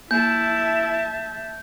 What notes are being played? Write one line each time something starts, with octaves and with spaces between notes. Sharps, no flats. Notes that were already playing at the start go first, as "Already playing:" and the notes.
A#3 E4 E5 A5 G6